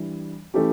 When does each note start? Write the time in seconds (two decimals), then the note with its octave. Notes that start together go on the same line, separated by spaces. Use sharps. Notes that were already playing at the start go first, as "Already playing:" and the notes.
Already playing: E3 G3 D4
0.54 E3 A3 C#4 G4